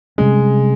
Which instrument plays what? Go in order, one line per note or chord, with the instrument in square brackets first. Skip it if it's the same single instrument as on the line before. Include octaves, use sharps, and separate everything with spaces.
[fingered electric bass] C3 G3 C#4 [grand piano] G#3